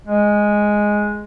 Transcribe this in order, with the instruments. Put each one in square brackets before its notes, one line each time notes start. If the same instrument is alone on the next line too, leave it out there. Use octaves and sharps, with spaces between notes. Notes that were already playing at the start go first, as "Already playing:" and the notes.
[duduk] G#3